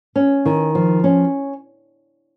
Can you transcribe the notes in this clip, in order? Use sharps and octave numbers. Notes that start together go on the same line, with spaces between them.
C#4
D#3
F3
C#4